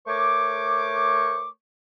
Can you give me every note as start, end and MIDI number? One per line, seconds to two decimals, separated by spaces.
0.07 1.48 57
0.07 1.48 70
0.07 1.48 72
0.07 1.48 73
0.07 1.48 85
0.07 1.48 86